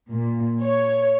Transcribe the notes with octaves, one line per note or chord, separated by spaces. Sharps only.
A#2
C#5